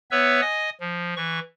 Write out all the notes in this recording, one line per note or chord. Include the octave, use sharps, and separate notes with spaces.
B3 B4 C#5 E5 E6
D#5 G#5 D#6
F3
E3 C#6